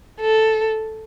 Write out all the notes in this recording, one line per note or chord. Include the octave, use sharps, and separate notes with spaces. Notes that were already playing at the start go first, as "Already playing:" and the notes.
A4